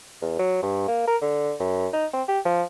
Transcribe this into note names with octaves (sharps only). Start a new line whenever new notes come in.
E2
F#3
G2
A#3
A#4
D3
F#2
D#4
C4
G4
F3